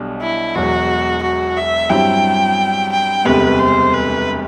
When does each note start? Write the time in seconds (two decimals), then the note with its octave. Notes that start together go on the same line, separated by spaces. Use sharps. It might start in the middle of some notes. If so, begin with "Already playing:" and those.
Already playing: B1 B2 G3 D4
0.21 E4
0.55 E1 E2 B2 F#3 F#4
1.22 F#4
1.57 E5
1.90 G2 F#3 C4 E4 G4 G5
2.92 G5
3.25 E1 D2 C3 G3 B3 B4
3.59 C5
3.93 B4